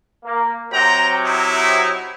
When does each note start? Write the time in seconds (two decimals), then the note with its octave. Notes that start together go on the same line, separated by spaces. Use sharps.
0.24 A#3
0.72 C3 F#3 G5 A#5
1.24 D#4 E4